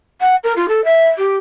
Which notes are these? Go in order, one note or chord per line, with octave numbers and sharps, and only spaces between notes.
F#5
A#4
F4
A4
E5
G4